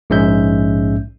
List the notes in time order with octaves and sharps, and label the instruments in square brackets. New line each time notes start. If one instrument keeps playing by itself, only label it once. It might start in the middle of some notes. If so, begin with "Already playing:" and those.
[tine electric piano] A#1 G#2 G#3 C#4 E5 G6